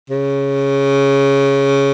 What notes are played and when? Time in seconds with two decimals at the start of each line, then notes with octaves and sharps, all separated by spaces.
0.10 C#3